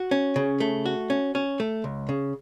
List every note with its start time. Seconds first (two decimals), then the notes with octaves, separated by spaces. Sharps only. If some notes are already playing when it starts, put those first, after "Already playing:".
Already playing: F#4
0.11 C#4
0.36 C#3
0.60 A3
0.86 F#4
1.10 C#4
1.35 C#4
1.60 A3
1.84 C#2
2.09 C#3